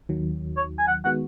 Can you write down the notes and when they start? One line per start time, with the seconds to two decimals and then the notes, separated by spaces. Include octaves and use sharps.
0.09 D#2 D#3 F#3
0.57 C#5
0.78 G#5
0.88 F#5
1.04 D#3 G#3 B3 F#4 F#5